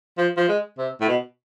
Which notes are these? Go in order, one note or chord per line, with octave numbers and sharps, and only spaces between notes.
F3
F3
G#3
C3
A2
B2